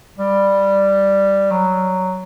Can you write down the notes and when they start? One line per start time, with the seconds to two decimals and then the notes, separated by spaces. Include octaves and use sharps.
0.18 G3
1.51 F#3